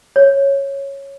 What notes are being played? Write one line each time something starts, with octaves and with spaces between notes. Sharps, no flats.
C#5